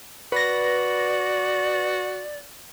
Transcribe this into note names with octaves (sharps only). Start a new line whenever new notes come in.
F#4 B4 D5 A#6